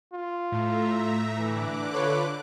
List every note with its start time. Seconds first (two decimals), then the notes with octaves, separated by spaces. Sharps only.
0.13 F4
0.52 A2 A3 E5 A#5
1.39 D3 E3 D6 F#6
1.94 F4 A4 B4 C#5